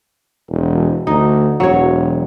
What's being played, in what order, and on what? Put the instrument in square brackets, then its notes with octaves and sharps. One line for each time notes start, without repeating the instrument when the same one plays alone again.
[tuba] E1
[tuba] D2 [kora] D#4
[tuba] E1 [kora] F#3 C#5